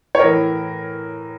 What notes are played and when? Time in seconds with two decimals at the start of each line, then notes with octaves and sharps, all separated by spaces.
0.15 C#5
0.19 A2 E3 A#4